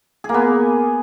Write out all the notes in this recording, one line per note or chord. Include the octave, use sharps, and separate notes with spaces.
G#4
A#3
B3